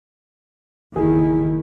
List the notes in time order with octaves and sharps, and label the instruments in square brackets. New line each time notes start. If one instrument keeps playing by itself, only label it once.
[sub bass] F#1 [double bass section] D#2 D#3 [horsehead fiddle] E4 [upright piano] G#4